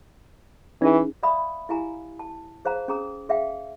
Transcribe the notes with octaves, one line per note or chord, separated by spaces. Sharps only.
E3 C#4 D#4 G#4
D5 E5 F5 B5 D#6
E4 G4 F5 G#5 A#5
A5
G#4 C5 F5 A#5
C#4 G#4 A#5 D#6
G#4 E5 F5 G5